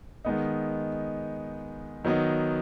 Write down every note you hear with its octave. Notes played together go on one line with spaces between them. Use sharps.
D#3 G#3 B3 D#4
D#3 F#3 B3 D#4